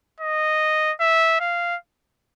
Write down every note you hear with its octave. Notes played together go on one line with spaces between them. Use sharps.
D#5
E5
F5